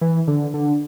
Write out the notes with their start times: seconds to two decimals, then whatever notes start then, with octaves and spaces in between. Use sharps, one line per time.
0.01 E3
0.27 D3
0.54 D3